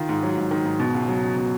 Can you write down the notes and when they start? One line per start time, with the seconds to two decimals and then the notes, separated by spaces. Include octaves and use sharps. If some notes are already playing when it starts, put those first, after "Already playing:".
Already playing: D#3 F4
0.09 G#2
0.23 F#3
0.38 G#2
0.51 D#3
0.66 G#2
0.79 B2
0.95 C#2
1.08 F#3
1.22 C#2
1.36 B2